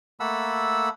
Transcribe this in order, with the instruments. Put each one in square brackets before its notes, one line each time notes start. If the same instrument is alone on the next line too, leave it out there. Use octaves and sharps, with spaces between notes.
[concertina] A3 A#3 A4 F#5 B5 E6